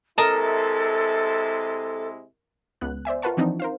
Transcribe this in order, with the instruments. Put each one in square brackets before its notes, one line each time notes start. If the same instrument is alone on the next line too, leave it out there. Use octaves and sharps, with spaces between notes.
[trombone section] C3 G#3 E4 [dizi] A4 [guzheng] A#4 D#5 A5
[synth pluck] C#2 B3 F#6
C5 D5 E5 G#5
F4 A#4 B4 F#5 A5 C#6
E3 F3 C4 D4 D#4
A#4 C5 F5